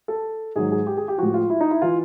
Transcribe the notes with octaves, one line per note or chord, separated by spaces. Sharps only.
A4
G#2 D#3 F#3 G#4
G#4
G4
G#4
G4
A2 F3 F#4
F4
E4
D#4
E4
E3 F4